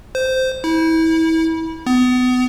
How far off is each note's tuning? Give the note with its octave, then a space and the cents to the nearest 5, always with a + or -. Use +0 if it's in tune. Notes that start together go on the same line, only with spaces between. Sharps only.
C5 -10
E4 -30
B3 +30